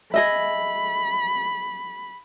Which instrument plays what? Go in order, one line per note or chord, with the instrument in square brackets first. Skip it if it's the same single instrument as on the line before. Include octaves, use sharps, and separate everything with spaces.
[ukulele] G#4 D#5 E5 [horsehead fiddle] B5